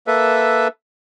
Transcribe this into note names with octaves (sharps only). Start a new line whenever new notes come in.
A#3 A4 B4 E5